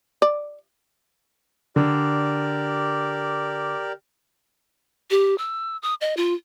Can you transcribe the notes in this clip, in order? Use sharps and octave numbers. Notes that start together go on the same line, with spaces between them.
D5
D3 G4 A#4 D5
G4
E6
D#6
D#5
F4